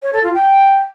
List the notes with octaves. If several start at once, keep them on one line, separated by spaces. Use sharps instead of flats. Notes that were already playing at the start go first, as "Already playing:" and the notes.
C#5
A4
F4
G5